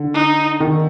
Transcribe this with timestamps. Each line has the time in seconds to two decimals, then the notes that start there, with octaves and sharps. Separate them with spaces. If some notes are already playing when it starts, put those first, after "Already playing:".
Already playing: D3
0.14 D#4
0.60 D#3